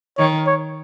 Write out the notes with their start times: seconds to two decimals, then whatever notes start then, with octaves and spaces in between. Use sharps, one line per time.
0.18 D#3 C#5
0.47 C#5